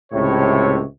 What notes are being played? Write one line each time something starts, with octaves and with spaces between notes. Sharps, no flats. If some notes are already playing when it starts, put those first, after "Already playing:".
C#2 A2 C3 C#5